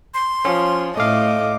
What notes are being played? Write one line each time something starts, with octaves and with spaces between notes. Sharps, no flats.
C6
F3 C#4
A2 A3 D#5 F5 D6